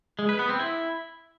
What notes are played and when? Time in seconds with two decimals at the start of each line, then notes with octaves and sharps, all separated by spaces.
0.19 G#3
0.29 B4
0.39 B3
0.49 C4
0.59 E4